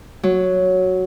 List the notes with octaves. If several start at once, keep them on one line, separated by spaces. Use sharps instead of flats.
F#3